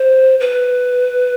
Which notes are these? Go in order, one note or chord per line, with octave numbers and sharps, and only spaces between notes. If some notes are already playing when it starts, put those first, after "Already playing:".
Already playing: C5
B4